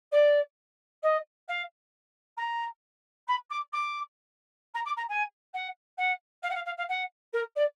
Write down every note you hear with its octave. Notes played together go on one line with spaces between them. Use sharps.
D5
D#5
F5
A#5
B5
D6
D6
A#5
D6
A#5
G#5
F#5
F#5
F5
F#5
F5
F5
F5
F#5
A#4
D5